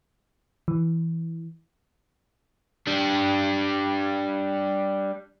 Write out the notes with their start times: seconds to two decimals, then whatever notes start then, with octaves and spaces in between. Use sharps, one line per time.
0.68 E3
2.88 G3 D4